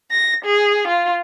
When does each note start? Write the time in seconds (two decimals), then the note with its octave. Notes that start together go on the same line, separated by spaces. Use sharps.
0.11 A#6
0.45 G#4
0.87 F4